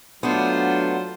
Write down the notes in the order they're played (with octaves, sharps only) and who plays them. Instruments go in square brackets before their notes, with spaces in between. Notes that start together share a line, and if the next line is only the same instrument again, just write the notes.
[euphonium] F#3 [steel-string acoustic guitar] A3 B3 [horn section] D4 [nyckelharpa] F4 C5